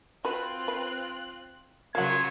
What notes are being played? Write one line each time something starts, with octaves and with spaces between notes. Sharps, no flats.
C4 F4 F#4 B4 F#6
B4
C#3 F#3 F4 A#4 F5 F#5 G#6